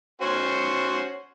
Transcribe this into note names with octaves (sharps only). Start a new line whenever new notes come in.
C#4 F#4 C5